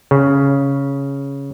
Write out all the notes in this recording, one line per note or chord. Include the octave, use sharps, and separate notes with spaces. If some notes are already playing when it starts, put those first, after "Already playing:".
C#3